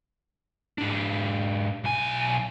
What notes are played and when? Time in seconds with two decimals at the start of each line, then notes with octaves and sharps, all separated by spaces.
0.78 G#2 D4
1.84 B1 G#5